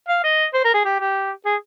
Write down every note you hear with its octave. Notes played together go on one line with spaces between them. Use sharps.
F5
D#5
C5
A#4
G#4
G4
G4
G#4